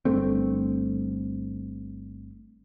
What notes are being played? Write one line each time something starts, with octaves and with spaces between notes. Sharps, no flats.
G1 G2 A3 C4